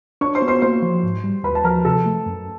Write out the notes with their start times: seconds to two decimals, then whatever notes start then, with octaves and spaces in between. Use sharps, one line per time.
0.21 D4 C#5 C#6
0.35 C5 C6
0.42 B3
0.48 C5 C6
0.62 A#3 C5 C6
0.82 F3
1.03 G#2
1.24 G3
1.43 D#2 B4 B5
1.55 A5
1.64 F3 A#4 A#5
1.85 C3 A4 A5
2.06 A3
2.26 F#2